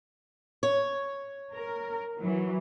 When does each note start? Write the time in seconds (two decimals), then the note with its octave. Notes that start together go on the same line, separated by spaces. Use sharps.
0.63 C#5
1.54 A#4
2.18 E3 F#3